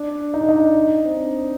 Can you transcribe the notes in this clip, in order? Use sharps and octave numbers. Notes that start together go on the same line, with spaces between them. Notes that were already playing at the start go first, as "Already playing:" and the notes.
Already playing: D4
D#4
D4
D#4
C4
D4